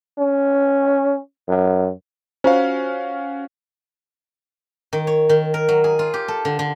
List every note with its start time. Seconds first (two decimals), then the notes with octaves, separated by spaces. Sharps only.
0.19 C#4
1.49 F#2
2.44 C#4 F4 F#4 C5 F5
4.93 D#3
5.07 C#5
5.29 D#3
5.54 A#4
5.68 F#3
5.84 G#4
5.99 F4
6.14 G4
6.28 A4
6.45 D3
6.59 D3